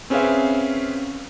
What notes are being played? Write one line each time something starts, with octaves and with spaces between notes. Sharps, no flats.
C4 C#4 G#4 B4 E5 F5